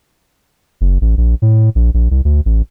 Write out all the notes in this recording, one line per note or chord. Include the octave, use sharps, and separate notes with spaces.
F#1
A1
A#1
A2
A#1
A#1
C2
D2
A1